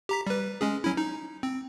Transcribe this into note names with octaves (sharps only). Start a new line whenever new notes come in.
G4 A#5 B6
G3 B4
G#3 C#4 G#4
F#3 C#4 E4
D#4
C4